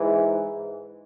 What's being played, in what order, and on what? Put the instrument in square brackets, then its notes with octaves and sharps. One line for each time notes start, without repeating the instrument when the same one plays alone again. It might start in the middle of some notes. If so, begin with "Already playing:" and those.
Already playing: [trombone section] G#2 E3